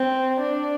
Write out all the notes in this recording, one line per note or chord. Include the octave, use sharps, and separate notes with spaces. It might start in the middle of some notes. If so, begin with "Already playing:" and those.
Already playing: C4
D4